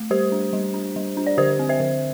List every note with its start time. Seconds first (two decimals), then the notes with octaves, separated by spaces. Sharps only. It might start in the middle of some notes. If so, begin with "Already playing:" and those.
Already playing: A3
0.10 G3 G4 C5
0.32 D4
0.53 G3
0.74 D4
0.96 G3
1.17 D4
1.27 D5
1.38 D3 G4 C5
1.59 C4
1.69 C5 E5
1.80 D3